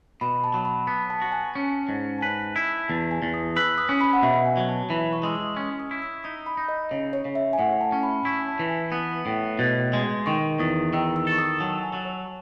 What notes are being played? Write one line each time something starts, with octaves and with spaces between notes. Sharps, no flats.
B2 B5
A5
F#3
B5
B3 A5
A5
F#4
G#5
C#4
G#2
A5
B4 G#5
E4
E2 A5
G#5
E2
D#6
B4 E6
D#6
C#4
B5
F#5
B2 E5
G#5
F#3
A5
E3 B5
C#6
G#3 E6
D#6
C#4 C#6
D#6
E4
E6
D#4 D#6
B5
D#4
D#5
C#3 C#5
C#5
C#3
E5
G#5
A2 F#5
A5
C#4
B5
E4 C#6
G#5
A5
E3
G#5
B3 A5
A2
B2
G#3
D#3 C#6
E2 D#6
D#3 E6
E6
A4 C#6
D#6
F#3 A5
G#5
F#3
C#5